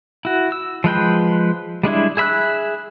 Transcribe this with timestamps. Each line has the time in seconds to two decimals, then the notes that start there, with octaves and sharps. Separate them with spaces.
0.25 E4 F#4
0.52 E6
0.84 F3 G#3 B4 G5
1.83 G3 G#3 D4 E4
2.17 G#4 E5 B5 E6 F#6